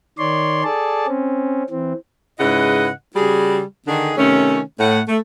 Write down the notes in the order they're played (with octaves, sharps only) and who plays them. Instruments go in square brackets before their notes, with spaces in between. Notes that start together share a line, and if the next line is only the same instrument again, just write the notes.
[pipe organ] D#3 C#5 D5 C6
G#4 A4 D5 A5
C4 C#4
E3 C4
[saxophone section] G#2 C#3 E4 B4 D#5 F#5
C#3 G3 F#4 G#4
D3 D#3 G#4
C3 D#3 A3 C#4
A2 F#5
A3